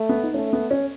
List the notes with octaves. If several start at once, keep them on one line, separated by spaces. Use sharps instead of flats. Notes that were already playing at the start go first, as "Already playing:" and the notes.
Already playing: A3
B3
D#4
A3 C#4
B3
C#4